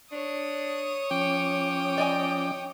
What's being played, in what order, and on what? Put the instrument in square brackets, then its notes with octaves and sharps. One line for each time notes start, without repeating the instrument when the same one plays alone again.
[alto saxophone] D4 [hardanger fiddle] C#5 D#6
[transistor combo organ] F3 C#4 D6 [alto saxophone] G5
[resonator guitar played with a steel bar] D5 D#5 G#5